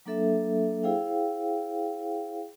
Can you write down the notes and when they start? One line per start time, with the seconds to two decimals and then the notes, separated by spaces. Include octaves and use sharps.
0.06 F#3 A#3 D4 A4 E5
0.83 E4 G#4 C5 F5 G5